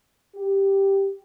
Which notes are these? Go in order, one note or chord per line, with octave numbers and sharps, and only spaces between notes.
G4